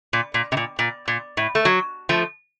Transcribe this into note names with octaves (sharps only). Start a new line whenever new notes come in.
A#2
A#2
C3
A#2
A#2
A#2
A2
A3
F#3
F3 A3